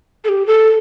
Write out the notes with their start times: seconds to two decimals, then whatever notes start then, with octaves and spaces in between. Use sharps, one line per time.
0.24 A4
0.29 G4
0.47 A4